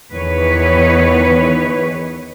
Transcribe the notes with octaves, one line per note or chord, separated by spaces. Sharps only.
E2 D#3 E3 B4 C#5